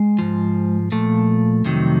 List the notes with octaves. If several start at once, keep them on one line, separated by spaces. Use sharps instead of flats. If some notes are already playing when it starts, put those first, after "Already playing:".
Already playing: G#3
G#2 F3
A#2 F3 A3
F2 C3 D#3 F#3